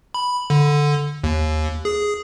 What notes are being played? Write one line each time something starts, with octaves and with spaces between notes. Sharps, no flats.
B5
D3
D#2
G#4